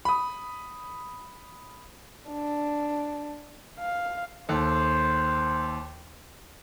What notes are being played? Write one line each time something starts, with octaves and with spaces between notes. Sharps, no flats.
B5 D#6
D4
F5
D#2 A4 C5